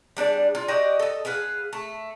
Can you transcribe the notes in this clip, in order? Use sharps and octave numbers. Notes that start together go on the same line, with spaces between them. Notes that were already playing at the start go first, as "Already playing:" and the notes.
G3 D4 G#4 D5
F4
F#4 G4 D5 D#5
A4 D#5
G#4 B4 F5 F#5
A3